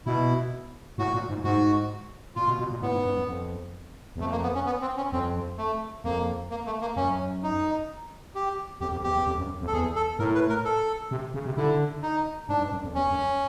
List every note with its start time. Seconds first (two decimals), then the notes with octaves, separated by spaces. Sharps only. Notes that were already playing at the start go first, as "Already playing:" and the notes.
0.06 B2 E4
0.98 A2 F#4
1.14 A#2
1.29 G#2
1.44 G#2 F#4
2.36 A#2 F4
2.48 B2
2.59 B2
2.71 A#2
2.82 A2 B3
2.94 G#2
3.05 G2
3.17 F#2
3.28 F2
4.16 E2
4.21 F2 A3
4.31 A#3
4.43 B3
4.55 C#4
4.66 B3
4.82 C4
4.97 C#4
5.12 F2 C4
5.58 A3
6.04 F2 A#3
6.50 A#3
6.66 A3
6.81 A#3
6.96 F#2 C#4
7.43 D#4
8.35 G4
8.81 F2 G4
8.92 F2
9.04 E2 G4
9.15 E2
9.27 F2
9.38 F#2
9.61 F2
9.67 A4
9.73 E2 G#4
9.95 A4
10.19 A2 A#4
10.35 B4
10.49 A#4
10.65 A4
11.11 C3
11.34 C#3
11.46 C3
11.57 D3 E4
12.02 D#4
12.49 G#2 D4
12.60 G2
12.72 F#2
12.84 F2
12.95 E2 C#4
13.11 F#2